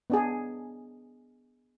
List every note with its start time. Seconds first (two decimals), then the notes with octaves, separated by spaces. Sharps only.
0.10 B3 D4 G#4